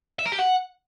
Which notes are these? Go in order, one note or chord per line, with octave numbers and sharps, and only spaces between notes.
E5
A#4
G4
F#5